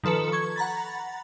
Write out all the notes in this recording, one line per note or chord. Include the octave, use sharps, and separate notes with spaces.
D#3 F3 A4 B4 C#7
C#6 G#6
F#5 A#5 B5 A6